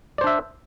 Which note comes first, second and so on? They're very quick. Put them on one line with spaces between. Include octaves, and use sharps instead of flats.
D5 C5 D4 E5